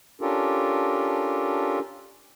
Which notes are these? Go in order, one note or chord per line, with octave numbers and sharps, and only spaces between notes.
C#4 D4 F4 G4 A4 A#4